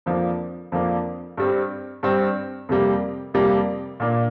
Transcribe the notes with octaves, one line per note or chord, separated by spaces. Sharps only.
F2 F3 A#3 D4
F2 F3 A#3 D4
G2 G3 C4
G2 G3 C4
F2 C3 G3 A#3
F2 C3 G3 A#3
A#2 A#3 D4